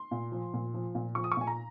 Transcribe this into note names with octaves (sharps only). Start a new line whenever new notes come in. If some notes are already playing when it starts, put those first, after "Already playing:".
Already playing: C6
A#2
F3
A#2
F3
A#2
F3 C#6
D#6
C#6
A#2 G#5
A#5